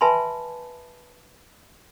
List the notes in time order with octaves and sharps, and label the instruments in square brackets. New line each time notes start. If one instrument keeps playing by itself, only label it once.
[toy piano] B4 E5 G#5 A5 B5 C6